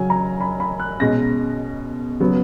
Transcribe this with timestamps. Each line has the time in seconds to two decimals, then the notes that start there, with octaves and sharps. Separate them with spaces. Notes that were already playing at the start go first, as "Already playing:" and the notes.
Already playing: C#3 F#3 C#4 G#5
0.10 A#5
0.40 B5
0.60 B5
0.80 F#6
1.00 B2 G#3 C#4 A#6
2.20 C#3 F#3 B3